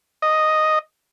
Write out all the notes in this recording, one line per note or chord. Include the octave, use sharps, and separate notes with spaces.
D#5